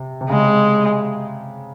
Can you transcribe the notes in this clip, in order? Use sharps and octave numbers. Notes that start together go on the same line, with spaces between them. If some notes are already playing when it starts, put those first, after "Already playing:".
Already playing: C3
C3
C#3 G#3